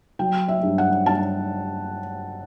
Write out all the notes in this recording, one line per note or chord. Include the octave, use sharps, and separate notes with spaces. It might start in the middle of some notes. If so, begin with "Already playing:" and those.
F#3 G5
E5
G2
F#5
G2 A5